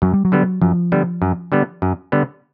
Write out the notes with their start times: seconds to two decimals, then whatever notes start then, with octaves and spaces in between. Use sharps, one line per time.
0.02 F#2 F#3
0.14 G3
0.25 F#3
0.32 D3 G3 B3
0.62 F#2 F3
0.92 D3 G3 B3
1.22 F#2
1.52 D3 G3 B3
1.82 F#2
2.12 D3 G3 B3